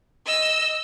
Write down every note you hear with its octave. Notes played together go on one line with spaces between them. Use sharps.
D#5 E6